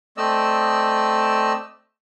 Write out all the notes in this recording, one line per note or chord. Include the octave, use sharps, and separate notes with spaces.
A3 C4 D5 D#5 E6